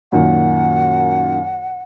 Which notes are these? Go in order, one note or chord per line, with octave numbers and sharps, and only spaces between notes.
F#2 A#2 D#3 F#5